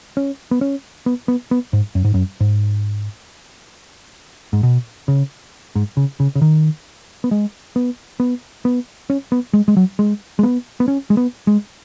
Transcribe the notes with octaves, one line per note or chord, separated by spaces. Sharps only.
C#4
B3
C#4
B3
B3
B3
G#2
F#2
G#2
F#2
G#2
G#2
B2
C#3
G#2
C#3
C#3
C#3
D#3
B3
G#3
B3
B3
B3
C#4
B3
G#3
G#3
F#3
G#3
G#3
B3
B3
C#4
G#3
B3
G#3